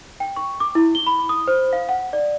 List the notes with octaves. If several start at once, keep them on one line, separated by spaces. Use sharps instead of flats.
G5
C#6
D6
E4
G7
B5
D#6
C5
F5
F#5
D5